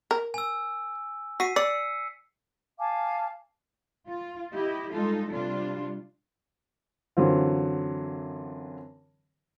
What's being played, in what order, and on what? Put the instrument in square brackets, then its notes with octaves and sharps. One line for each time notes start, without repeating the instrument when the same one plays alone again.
[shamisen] A#4
[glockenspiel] G#5 E6
[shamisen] F#4 [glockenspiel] B6 C7 D#7
[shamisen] D5 [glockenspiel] E6 C#7
[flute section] F5 G#5 A5 D6
[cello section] F4
E4 G4 D#5
G3 G#3 D#4 F4 A4
C3 G3 D4 F4
[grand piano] F#2 D3 E3 F#3 C4 F4